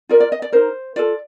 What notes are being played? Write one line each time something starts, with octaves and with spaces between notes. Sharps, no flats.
F4 A#4 D5
D5
D#5
D5
D#4 A#4 C5
F4 A4 D5